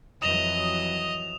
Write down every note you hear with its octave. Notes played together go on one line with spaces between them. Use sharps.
F2 E3 F#3 D#5 D#6 E7 F7